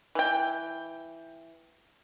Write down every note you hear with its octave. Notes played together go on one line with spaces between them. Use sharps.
E3 G5